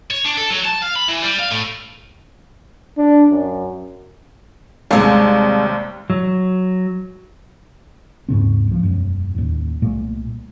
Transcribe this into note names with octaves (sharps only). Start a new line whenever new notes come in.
C#5
D4
A4
F#3
A5
F5
B5
E3
G3
F5
A2
D4
F#2
D#2 C3 G3 G#3
F#3
D#2 G#2 C#3 C4
C#2 F3
E1 F#2
A1 D#2
C2 A#2 A3